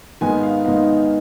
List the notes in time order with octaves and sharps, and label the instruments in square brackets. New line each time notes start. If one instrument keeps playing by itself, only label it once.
[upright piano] G#2 D#3 B3 D#4 G#5
F5
G#2 D#3 B3 D#4 F5